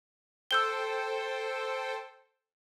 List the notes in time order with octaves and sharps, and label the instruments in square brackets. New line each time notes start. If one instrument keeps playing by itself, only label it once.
[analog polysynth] A4 C5 G5 [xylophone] E6 G6 G7